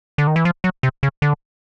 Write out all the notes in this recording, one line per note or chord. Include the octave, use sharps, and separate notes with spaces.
D3
D#3
E3
F3
F#3
C3
C#3
D3